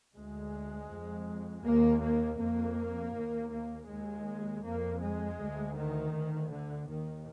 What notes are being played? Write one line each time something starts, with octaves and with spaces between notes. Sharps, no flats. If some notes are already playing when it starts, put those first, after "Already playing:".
D2 G#3
F2
D#2 A#3
A#3
F2 A#3
D#2
A#3
D#2 G#3
F2 A#3
G#3
D2
D#3
D2
D3
D#2 D#3